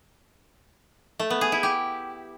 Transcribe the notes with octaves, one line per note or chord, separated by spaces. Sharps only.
A3
B3
G#4
E4
G4